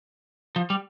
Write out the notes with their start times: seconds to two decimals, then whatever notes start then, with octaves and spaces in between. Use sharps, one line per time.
0.56 F3
0.70 G3